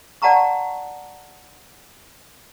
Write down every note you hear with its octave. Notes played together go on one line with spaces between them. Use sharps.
D5 F#5 A5 A#5 C#6